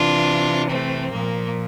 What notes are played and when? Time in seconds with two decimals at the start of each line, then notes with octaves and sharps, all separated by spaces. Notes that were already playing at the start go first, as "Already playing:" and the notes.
Already playing: C3 E3 D4 F4
0.71 A3 C4
1.12 A#2 F3 A#3